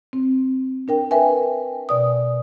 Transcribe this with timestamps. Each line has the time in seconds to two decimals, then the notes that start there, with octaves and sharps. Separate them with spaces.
0.13 C4
0.88 D4 A#4 G5
1.11 A#4 B4 E5 G5 G#5
1.89 B2 D5 D#6